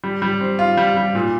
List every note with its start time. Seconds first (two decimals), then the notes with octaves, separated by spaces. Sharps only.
0.04 G3
0.22 G3
0.41 C4
0.59 F4
0.77 G3
0.97 G3
1.15 A#2